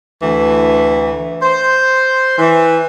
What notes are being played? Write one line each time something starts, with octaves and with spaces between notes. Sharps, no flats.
D2 E3
C5
E3